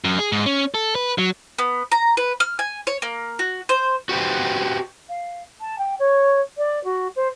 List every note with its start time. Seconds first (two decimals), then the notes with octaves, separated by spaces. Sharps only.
0.04 F#2
0.19 G#4
0.32 G#2
0.46 C#4
0.74 A4
0.95 B4
1.18 F#3
1.59 B3
1.92 A#5
2.17 B4
2.40 F6
2.59 G#5
2.87 C#5
3.02 A#3
3.39 F#4
3.69 C5
4.09 F#4 G4 B4 C5
5.09 F5
5.60 A5
5.78 G5
5.99 C#5
6.57 D5
6.84 F#4
7.16 C5